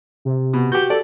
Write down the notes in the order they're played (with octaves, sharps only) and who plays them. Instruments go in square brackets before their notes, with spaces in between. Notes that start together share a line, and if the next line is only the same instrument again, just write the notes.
[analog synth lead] C3
[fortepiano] B2
[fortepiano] F#4 G4 [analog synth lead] G6
[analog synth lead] A4 [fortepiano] D5